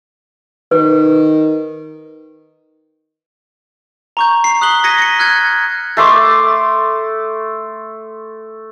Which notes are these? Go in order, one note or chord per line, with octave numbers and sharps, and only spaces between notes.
D#3 B4
A#5 C#6 G6
C7
D#6 F#6 B6 F#7 G7
D#6 G#6 A#6 B6 C#7 D#7
A#6 C#7
F6 F#6 G#6 C#7
A3 C6 D6